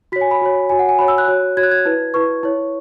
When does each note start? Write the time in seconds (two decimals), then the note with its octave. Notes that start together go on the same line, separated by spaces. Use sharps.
0.12 F#4 C#5 B6
0.21 G#5
0.31 B5
0.42 F#4 C#5
0.69 F#4 C#5 G#5
0.79 F#5
0.89 G#5
0.99 F#4 C#5 B5
1.08 E6
1.18 F#6
1.28 F#4 C#5
1.57 F#4 C#5 G#6
1.63 F#6
1.71 G#6
1.86 E4 B4
2.14 E4 B4 C#6
2.43 E4 C#5